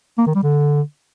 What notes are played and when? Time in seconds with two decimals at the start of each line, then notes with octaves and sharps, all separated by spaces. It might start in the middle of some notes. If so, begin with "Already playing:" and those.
0.18 A#3
0.27 D#3
0.35 G3
0.43 D3